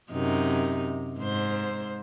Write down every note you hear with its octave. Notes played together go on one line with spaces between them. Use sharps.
F#2 C3 D#4
G#2 C5